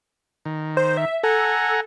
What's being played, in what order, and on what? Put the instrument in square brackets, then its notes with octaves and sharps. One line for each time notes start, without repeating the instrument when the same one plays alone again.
[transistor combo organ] D#3
[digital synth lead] C5
E5
[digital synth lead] A4 [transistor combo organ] F#5 G#5 A#5